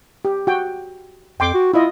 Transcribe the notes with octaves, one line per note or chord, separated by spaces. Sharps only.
G4
F#4 G5
F2 G5 C6 D6
F#4
E4 F4 D#5